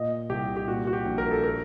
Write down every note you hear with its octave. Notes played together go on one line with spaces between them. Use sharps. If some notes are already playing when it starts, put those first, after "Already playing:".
Already playing: A#2 D#5
C2 G4
G4
A#2 F#4
F#4
G4
A#1
A#4
A4
A#4